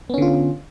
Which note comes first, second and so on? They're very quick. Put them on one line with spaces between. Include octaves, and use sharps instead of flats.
B3 C#4 D3 F4